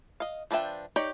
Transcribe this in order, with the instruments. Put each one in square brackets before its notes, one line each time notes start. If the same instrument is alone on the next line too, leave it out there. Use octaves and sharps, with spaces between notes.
[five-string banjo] D#5 F5
F3 D4 B4 E5 G5
D#4 G4 C#5 D5